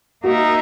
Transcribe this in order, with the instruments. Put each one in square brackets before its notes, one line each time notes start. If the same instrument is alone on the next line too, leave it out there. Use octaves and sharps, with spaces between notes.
[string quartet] A#3 D#4 A#4 E5 [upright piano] F#4